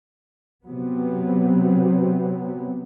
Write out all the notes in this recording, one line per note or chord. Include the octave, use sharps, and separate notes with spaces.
C3 F#3 B3